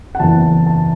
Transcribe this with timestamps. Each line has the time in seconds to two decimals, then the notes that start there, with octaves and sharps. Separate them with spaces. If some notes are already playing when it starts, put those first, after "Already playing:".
0.15 F#5
0.19 F#1 E2 E3 A5
0.67 A5